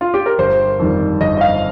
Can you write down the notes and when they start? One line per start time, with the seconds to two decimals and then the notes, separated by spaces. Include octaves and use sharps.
0.01 F4
0.14 G4
0.26 A#4
0.38 G1 C5
0.79 F2 D#3 G3
1.20 G1 D#5
1.37 D#5
1.41 F5